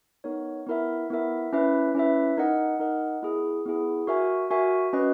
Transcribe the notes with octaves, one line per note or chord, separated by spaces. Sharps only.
B3 D#4 A#4 C#5
B3 E4 A#4 E5
B3 E4 A#4 E5
C#4 E4 B4 E5
C#4 E4 B4 E5
D#4 A#4 D#5 F#5
D#4 A#4 D#5 F#5
B3 E4 G#4
B3 E4 G#4
F#4 A#4 E5 G#5
F#4 A#4 E5 G#5
C#4 F#4 B4 D#5